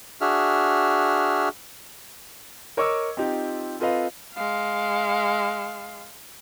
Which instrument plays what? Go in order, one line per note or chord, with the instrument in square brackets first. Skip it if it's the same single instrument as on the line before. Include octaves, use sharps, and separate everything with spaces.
[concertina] D4 F#4 G#4 E5 F6
[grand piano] A#4 C#5 D#5 C#6 D6 E6
C4 D#4 F4 G4
C4 F4 A4 B4 D#5 F5
[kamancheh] G#3 F5